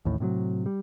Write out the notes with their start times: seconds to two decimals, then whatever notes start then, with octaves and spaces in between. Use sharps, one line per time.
0.05 A1 D#2 A2
0.20 A2 C3 E3 F#3
0.66 G3